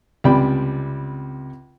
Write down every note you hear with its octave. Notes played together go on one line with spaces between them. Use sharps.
C#2 C3 G3 D5 G5 B5